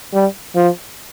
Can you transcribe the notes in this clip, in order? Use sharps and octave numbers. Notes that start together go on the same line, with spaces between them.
G3
F3